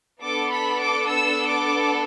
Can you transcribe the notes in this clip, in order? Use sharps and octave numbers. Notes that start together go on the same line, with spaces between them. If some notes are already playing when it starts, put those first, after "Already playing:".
B3 D4 A4 D6
B5
D6
E6
D6